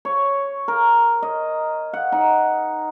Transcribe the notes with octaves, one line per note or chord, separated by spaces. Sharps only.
C#5
A#4
D#5
F#5
D#4